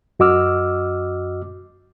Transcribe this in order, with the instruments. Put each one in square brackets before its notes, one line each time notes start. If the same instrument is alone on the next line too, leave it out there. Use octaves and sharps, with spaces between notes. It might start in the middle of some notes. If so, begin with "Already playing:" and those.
[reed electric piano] F#2 F#4 D#5 D6 E6 F6